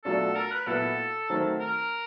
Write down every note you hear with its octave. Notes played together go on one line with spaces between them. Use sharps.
B2 F#3 A3 D4 F4 A4
A#4
B4
A#2 F#3 B3 E4 A4
D#3 F#3 A3 C4
A#4